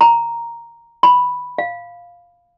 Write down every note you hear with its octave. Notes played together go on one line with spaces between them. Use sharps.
A#5
B5
F5